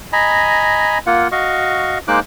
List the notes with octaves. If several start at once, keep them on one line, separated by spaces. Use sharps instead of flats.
D#5 G#5 A#5 B5
A#3 F4 F#5
F#4 D#5 F5 C#6
G#3 A#3 D#4 C5 D6 F#6